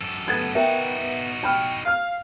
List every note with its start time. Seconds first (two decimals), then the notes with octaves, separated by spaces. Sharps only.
0.01 F#2 A4
0.28 A3 B3 G#6 A6
0.55 B3 D#4 F#4 A#4 E5 G5
1.43 G5 B5 F6
1.85 F5 F6 C7